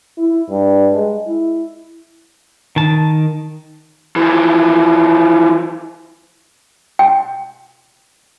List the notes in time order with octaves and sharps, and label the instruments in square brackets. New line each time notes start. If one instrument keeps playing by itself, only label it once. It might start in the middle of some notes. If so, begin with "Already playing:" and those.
[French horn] E4
G2
G#3
E4
[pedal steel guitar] D#3 A5
[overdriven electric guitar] E3 F3
[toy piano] G5